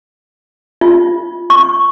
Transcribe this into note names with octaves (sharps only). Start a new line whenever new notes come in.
F4
C#6